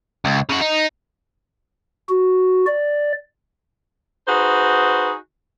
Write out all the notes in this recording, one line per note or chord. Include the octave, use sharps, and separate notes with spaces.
C#2
C#3 F#4
D#4
F#4
D5
D#4 F#4 G#4 B4 C5